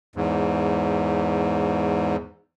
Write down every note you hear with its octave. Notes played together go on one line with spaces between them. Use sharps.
E2 G#2